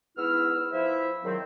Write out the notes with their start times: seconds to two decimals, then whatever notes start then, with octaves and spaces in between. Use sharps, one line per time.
0.17 G#2 B3 E4 E6 F6
0.73 F3 E4 E5
1.24 G#2 D#3 F#3 C4